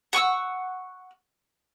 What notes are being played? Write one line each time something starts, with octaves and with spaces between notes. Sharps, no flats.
F#5 C#6 D#6 E6